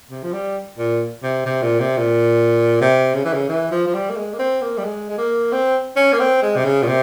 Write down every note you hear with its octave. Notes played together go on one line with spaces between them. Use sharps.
C3
F3
G3
A#2
C3
C3
A#2
C3
A#2
C3
C#3
E3
C#3
E3
F3
F3
G3
A#3
G#3
A#3
C4
A#3
G3
G#3
G#3
A#3
C4
C#4
A#3
C4
G#3
C3
C#3
A#2
C3